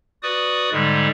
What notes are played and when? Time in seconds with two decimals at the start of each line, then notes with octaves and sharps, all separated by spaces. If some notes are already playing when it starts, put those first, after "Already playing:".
0.22 F#4 B4 D5 D#6
0.72 G#2 D3 G3 G#3